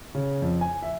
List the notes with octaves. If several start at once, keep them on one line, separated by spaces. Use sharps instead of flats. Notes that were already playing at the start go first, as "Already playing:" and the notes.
C#3
F2
G#5
E5